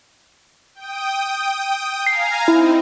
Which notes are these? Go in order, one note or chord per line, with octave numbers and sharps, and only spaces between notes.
G5 D#6
F5 G#5 A#5 C7
C4 D#4 E4